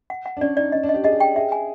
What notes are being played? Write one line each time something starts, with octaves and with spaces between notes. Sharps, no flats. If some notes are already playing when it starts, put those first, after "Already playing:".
F#5
F#5
D4
C#4 D5
D#4 D5
C#4 D#5
D4
D#5
G4
G#4 D#5
G4
G5
G#4 E5
G#5